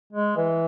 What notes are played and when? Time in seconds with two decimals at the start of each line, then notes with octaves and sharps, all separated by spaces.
0.13 G#3
0.37 E3